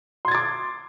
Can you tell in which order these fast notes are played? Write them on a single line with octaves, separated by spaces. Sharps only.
C6 G#6 A6 D6